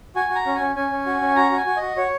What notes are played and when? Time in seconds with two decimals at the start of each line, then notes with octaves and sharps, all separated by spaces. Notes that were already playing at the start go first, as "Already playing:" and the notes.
0.16 F#4 G#5
0.30 F#4
0.35 A#5
0.46 C#4
0.55 G#5
0.60 C#4
0.76 C#4 G#5
0.91 C#4
1.06 F#4
1.21 C#4
1.36 F#4 A#5
1.52 F#4 G#5
1.66 F#4
1.77 D#5
1.82 F#4
1.97 F#4 C#5